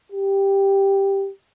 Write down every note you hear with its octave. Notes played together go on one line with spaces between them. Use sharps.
G4